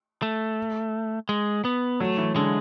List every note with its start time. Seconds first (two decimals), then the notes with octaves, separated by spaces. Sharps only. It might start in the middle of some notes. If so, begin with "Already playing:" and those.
0.22 A3
1.29 G#3
1.65 B3
2.00 F#3 A3
2.18 E3
2.36 D3 G#3